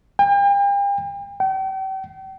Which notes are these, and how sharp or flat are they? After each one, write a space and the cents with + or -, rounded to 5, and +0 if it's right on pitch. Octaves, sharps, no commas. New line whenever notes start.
G5 +40
G5 -40